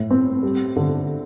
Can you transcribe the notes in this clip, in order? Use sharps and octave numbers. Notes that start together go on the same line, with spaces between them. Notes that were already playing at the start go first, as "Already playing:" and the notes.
Already playing: A2
C4
G3
D3